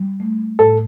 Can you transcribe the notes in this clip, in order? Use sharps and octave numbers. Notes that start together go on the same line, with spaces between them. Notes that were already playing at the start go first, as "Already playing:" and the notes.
Already playing: G3
A3
A2 A4